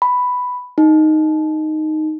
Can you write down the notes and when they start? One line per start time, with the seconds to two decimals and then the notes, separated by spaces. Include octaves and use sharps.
0.02 B5
0.78 D#4